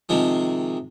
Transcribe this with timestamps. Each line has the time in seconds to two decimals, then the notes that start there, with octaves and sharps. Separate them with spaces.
0.09 C3 D#3 F3 G#3